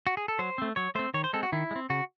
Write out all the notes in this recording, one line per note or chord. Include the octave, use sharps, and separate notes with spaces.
F#4
G#4
A4
F#3 C5
A3 C4
F#3 C#5
A3 C4 C5
D#3 C#5
C5
G#3 C4 A4
F#4
D#3 E4
G#3
C4
C#3 F#4